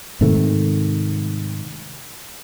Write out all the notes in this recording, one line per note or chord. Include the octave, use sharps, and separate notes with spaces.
G#2 C3 D#3 A3